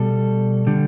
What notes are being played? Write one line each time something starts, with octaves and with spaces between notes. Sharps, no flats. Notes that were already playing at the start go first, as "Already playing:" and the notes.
Already playing: B2 G3 A4
D3 G3